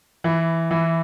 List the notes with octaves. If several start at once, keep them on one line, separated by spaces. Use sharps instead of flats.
E3
E3